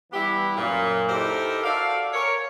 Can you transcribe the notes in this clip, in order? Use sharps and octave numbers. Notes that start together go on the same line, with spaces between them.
E3 G3 B3 E4 G4
F#2 A#2
D#4 E4 G4 A4 A#4 C5
F#4 A4 D5 E5 F5
A#4 C#5